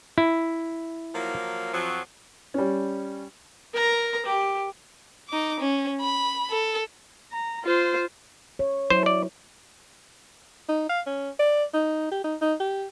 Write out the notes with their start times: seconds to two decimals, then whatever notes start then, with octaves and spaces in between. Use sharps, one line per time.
0.18 E4
1.15 F3 F#3 A#3
1.74 F2 F3 F#3
2.54 G3 C#4
3.74 A#4 A#5
4.26 G4
5.28 D#4 D6
5.60 C#4
6.01 B5
6.51 A4
7.32 A#5
7.64 F4 C5
8.59 C#5
8.90 F#3 E4 C5
9.06 D5
10.69 D#4
10.89 F5
11.07 C#4
11.39 D5
11.74 D#4
12.11 G4
12.24 D#4
12.41 D#4
12.60 G4